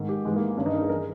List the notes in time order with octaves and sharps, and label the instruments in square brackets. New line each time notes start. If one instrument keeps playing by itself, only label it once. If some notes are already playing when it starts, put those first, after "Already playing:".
Already playing: [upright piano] G#2 D#3
G4
G#2 E3 G#3
A#3
G2 D#3 C#4
D#4
A#4
G#4
E3 A#4